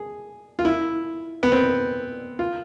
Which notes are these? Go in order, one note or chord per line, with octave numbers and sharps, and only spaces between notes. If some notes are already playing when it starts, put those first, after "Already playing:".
Already playing: G#4
F4
E4
B3
C4
F4